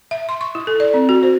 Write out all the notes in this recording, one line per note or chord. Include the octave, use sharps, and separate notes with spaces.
E5
C6
C#6
E4
A4
D5
C4
F#4
C5